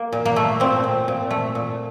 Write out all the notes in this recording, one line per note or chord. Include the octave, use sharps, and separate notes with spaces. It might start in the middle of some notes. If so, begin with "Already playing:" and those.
Already playing: A#3
A#2
A#3
A3
A#2 C4
A#2
A#2
A3
A#2